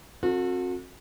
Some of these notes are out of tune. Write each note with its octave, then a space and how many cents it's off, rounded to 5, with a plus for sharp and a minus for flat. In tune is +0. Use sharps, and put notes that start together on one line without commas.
C4 +35 F#4 -35 A4 +25